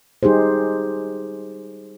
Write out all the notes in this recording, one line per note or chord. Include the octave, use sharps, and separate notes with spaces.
G3 D#4 G4 G#4 C5